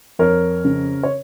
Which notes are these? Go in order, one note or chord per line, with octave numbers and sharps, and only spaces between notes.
F2 A#4 C#5
C#3
C#5